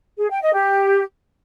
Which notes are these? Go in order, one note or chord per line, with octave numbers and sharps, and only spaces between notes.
G#4
G5
D#5
G4